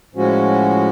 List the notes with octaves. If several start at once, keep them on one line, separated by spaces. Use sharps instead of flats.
A2 F3 G#3 C#4 F#4